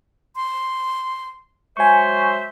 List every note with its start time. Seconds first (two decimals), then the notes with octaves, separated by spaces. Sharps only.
0.36 C6
1.77 F#3 G#3 C5 E5 G#5 C#6